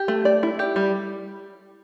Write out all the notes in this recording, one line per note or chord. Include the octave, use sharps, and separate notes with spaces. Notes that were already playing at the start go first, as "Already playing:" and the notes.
Already playing: G4
A3
D5
E4
G4
G3